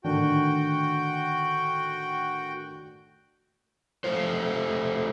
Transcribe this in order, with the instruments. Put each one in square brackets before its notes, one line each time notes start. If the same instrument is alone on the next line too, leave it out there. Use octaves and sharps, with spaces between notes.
[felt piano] A2 D3 D#3 [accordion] F#4 G5
[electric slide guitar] A3 F4 C5